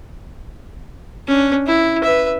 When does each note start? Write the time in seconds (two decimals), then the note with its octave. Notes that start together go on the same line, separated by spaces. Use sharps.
1.27 C#4 D4
1.66 E4
2.04 B4 E5